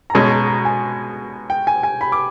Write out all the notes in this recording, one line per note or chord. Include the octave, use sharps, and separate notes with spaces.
A#5
B2 G#3 C#4 A5
A#5
A#5
G#5
G5
G#5
G#5
B5
D6